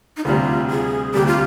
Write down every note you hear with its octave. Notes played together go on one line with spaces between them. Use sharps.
D#4
D2 C3 G3 F4
G#4
D2 C3 G3 G4
F4